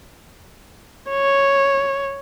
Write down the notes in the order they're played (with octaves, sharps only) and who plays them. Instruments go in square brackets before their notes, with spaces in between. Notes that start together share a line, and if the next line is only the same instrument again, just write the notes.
[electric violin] C#5